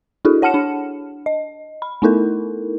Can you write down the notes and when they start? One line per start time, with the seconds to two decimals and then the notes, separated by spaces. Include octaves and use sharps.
0.25 D4 E4 F#4 G#4 A4
0.42 C#5 F#5 A5 F6 C#7 E7
0.54 D4
1.26 D#5
1.82 B5
2.02 A3 B3 D#4 E4 A4 A#4